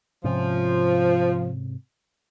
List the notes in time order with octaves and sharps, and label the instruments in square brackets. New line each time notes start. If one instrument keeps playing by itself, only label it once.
[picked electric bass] G#2 C3 C#4 [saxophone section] F3